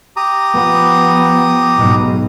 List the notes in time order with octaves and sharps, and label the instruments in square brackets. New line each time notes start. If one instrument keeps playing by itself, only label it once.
[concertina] G4 A#5 D#6
[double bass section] F3 B3
B1 G#2 B2